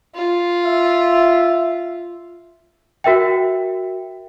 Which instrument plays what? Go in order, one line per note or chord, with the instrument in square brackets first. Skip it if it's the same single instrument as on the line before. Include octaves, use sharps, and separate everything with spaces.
[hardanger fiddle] F4
[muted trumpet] E5
[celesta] F#4 A#4 E5 G5